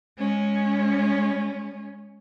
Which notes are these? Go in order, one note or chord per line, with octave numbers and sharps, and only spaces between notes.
G#3 C#4